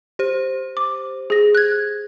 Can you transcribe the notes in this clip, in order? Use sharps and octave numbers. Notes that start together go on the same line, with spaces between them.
G4 C5
D6
G#4 A#6
F#6 G#6